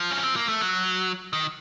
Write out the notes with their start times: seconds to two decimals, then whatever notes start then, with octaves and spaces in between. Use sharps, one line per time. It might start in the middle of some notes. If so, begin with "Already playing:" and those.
Already playing: F3
0.11 C#4
0.23 C4
0.36 A#3
0.49 A3
0.61 F#3
1.33 D#3